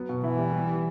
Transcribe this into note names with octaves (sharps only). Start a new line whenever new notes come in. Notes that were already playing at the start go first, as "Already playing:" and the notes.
Already playing: F#3 B3
B2
E3 E4
G3
G3